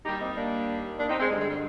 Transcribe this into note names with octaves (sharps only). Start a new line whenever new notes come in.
D#2 D#3 G3 D#4 G4
C4 D#4
A#3 D4
A#3 D4
C4 D#4
G#3 C4
G2 D3 G3 G#3
G#3
G3